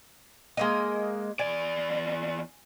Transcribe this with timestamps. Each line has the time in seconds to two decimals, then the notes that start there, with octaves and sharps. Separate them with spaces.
0.57 G#3 A#3 D#5
1.39 E2 D5 G#5